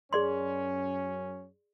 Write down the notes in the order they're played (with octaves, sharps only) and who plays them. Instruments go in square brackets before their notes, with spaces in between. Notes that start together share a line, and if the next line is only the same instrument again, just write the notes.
[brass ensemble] F#2 C#4 [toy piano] G#4 D5 C6